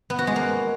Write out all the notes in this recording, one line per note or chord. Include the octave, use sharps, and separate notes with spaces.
B3
F#4
G#3
A#3